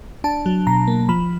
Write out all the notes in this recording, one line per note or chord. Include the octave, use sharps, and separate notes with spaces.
D4 A5
F#3
B2 A#5
A#3
F3 B5